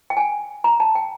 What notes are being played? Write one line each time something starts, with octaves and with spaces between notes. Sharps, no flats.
G5
G#5
A#5
A5
G5